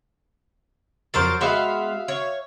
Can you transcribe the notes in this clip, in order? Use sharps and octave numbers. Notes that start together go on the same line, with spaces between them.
F2 F#3 A#4 C5 A6
G#3 B3 F#4 E5 F5
C#5